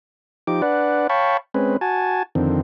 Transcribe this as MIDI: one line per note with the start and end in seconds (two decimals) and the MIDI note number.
0.47 0.62 53
0.47 0.62 63
0.47 0.62 67
0.47 0.62 86
0.62 1.07 62
0.62 1.07 71
0.62 1.07 74
0.62 1.07 78
1.10 1.37 73
1.10 1.37 77
1.10 1.37 79
1.10 1.37 81
1.10 1.37 83
1.10 1.37 85
1.54 1.77 56
1.54 1.77 60
1.54 1.77 61
1.54 1.77 71
1.81 2.23 66
1.81 2.23 80
1.81 2.23 81
2.35 2.61 41
2.35 2.61 50
2.35 2.61 51
2.35 2.61 60